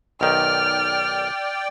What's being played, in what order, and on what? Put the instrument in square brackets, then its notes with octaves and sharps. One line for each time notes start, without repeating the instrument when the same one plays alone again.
[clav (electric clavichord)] B1 D#3 [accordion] D5 G5 [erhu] F6